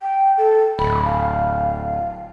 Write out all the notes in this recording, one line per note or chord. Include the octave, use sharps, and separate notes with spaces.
G5
A4
D1 B5
F5